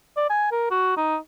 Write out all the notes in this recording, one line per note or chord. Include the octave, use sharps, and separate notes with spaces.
D5
G#5
A#4
F#4
D#4